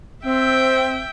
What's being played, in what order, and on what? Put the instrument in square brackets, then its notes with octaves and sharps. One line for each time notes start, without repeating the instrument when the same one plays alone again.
[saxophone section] C4 [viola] E5 G5